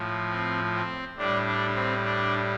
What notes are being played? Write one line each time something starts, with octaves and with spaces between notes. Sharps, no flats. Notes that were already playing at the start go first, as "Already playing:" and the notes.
Already playing: A2 F3
C4
C4
A2 G3 D4
D4
C4
D4